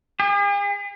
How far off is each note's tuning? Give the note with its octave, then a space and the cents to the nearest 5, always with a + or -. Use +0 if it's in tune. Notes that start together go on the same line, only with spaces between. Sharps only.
G#4 -45